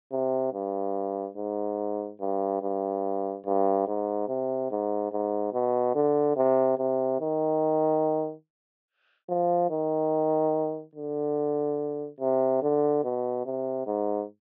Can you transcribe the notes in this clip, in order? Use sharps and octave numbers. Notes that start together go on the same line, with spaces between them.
C3
G2
G#2
G2
G2
G2
G#2
C3
G#2
G#2
B2
D3
C3
C3
D#3
F3
D#3
D3
C3
D3
B2
C3
G#2